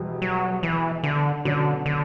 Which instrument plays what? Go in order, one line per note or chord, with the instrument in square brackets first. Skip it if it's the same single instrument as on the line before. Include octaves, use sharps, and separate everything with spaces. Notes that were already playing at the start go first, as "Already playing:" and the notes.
Already playing: [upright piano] E1 E2 B2 G3
[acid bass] F#3
E3
D3
[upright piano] B2 F#3 C#4 [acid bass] D3
[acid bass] D3